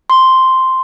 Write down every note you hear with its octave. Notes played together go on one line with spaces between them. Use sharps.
C6